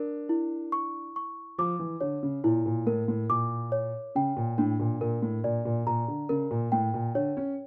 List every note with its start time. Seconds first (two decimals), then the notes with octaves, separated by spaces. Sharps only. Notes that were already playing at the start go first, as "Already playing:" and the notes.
Already playing: D4 A#4
0.29 E4
0.72 C#6
1.16 C#6
1.58 F3 D6
1.79 E3
2.01 D3 C#5
2.23 C#3
2.44 A#2 E4
2.66 A#2
2.86 A2 A#4
3.08 A2
3.30 A#2 D6
3.72 C#5
4.15 C#3 G5
4.37 A#2
4.58 A2 D4
4.80 A#2
5.01 A#2 A#4
5.22 A2
5.44 A#2 D5
5.65 A#2
5.87 A#2 A#5
6.08 D3
6.29 C#3 A#4
6.51 A#2
6.72 A2 G5
6.94 A#2
7.15 D3 C#5
7.37 C#4